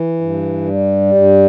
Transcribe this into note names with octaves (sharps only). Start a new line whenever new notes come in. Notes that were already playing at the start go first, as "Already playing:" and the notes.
Already playing: E3
G2
G3
G2